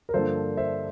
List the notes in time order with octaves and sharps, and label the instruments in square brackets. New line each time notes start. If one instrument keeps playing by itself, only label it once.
[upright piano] A#4
G2 D3 F3 A#3 D4 A4 C5
C5 E5